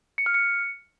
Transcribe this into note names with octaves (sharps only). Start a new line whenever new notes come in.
C#7
F6
C#7